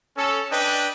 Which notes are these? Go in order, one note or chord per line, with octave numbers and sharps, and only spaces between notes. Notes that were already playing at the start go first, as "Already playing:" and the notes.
C#4 A4
D4 B4 D#5 G5